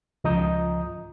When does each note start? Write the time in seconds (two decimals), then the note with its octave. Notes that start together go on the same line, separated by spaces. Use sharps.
0.24 C#2 F3 D#5 A#5 D#6 G6